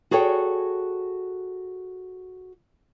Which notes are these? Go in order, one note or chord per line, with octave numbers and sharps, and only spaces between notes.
F#4 G#4 A4 C#5 G5